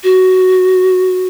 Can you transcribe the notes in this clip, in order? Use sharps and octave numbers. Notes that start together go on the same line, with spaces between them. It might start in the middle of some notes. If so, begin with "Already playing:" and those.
F#4